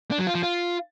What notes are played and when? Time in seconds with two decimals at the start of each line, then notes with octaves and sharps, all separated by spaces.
0.11 D4
0.19 F#3
0.27 F4
0.35 F3
0.43 F4